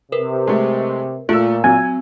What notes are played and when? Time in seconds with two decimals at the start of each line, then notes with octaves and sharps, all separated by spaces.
0.12 C3 A#4 B4
0.47 G#3 A3
1.29 A#2 A3 F4 E6
1.64 F#3 C4 G#5